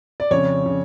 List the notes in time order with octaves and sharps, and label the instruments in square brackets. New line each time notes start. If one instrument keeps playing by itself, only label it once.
[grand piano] D5
F2 C#3 C#5
C#3